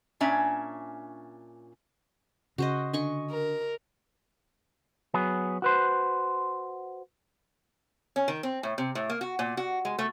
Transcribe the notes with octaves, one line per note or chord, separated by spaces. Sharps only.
A#2 C#4 D4 E5 G#5
C#3 F#4 C5 D#5
D3 D#5 G#5 C#6
A#4
F#3 B3 G#4
F#4 B4 C5
C#4
D#3
C4
A2
C3
A2
A#3
F#4
A#2
F#4
G#3
A3